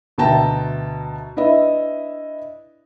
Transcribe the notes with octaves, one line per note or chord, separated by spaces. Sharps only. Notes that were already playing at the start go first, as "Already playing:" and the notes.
D2 B2 E5 G5 A5 A#5
D4 E4 B4 D#5 E5